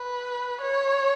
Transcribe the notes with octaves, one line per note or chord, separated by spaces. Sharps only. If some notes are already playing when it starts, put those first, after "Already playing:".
Already playing: B4
C#5